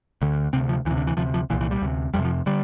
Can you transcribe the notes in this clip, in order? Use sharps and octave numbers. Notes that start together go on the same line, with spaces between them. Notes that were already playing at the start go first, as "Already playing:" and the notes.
D2 D3
D2 C3 C4
F3
D2 E3
C3
D3
E3
D2 C3 F3
F3
C2 A#2 E3
E3
G3
D2 C3
F2 C3 G3
F3
D3 G3